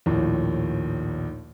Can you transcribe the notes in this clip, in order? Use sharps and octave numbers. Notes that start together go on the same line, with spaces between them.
A#1 D#2 A2